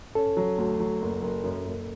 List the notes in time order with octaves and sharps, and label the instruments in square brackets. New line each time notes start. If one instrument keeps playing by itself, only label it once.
[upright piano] C#4 [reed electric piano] A4
[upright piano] F#3
D2
F#3
F#1
F#1
F#2
F#1